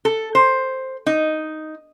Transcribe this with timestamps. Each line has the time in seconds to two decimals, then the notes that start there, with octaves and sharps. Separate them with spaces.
0.05 A4
0.35 C5
1.06 D#4